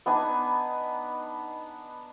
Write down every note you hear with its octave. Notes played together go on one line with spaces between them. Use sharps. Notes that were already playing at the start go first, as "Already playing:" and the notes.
B3 D4 D#4 G#5